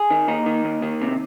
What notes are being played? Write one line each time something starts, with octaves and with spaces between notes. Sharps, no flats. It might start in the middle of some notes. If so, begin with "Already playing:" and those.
Already playing: G#4
D#3
D#2 D#4
D#3
D#2
D#3
C3